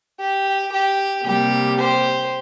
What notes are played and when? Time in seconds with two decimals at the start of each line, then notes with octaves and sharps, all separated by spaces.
0.19 G4
0.72 G4
1.25 C3 G3 A#3 G4
1.78 G4 C5